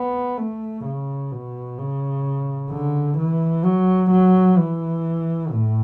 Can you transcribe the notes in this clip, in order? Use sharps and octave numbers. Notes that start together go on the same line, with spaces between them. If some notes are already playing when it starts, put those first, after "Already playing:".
Already playing: B3
A3
C#3
B2
C#3
D3
E3
F#3
F#3
E3
A2